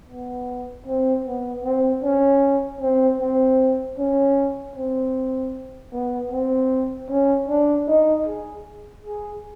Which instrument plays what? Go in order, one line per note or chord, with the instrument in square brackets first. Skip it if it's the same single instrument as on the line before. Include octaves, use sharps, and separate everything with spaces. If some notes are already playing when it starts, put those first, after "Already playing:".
[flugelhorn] B3
C4
B3
C4
C#4
C4
C4
C#4
C4
B3
C4
C#4
D4
D#4
G#4
G#4